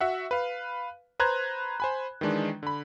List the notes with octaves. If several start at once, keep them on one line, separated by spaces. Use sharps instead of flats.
F#4 E5 F#5
B4 F5
B4 C5 A#5 F#6 G#6
C5 G#5 B5
D#3 E3 G#3 D4
D3 B5